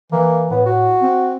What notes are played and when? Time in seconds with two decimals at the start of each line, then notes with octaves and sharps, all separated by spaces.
0.12 E3 A#3
0.51 A2 B3
0.66 F#4
1.02 C4